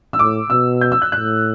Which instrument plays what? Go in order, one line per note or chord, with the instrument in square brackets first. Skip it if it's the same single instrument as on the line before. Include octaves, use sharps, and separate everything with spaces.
[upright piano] E6
[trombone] A2 [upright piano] D6
[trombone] B2 [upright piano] E6
[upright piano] G6
E6
F#6
[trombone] A2 [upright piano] F#6